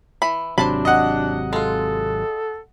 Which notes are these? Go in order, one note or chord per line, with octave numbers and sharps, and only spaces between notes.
E3 B5
G#1 C3 F#3 D4 C5 A5 B5
D#5 F#5
G#3 F4 A4